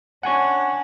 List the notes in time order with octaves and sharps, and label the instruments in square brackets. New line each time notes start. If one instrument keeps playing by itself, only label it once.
[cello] C#4 D4 [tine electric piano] F#5 G#5 C#6